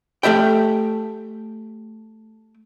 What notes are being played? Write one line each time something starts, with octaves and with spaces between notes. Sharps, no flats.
A3 G4 E5 G5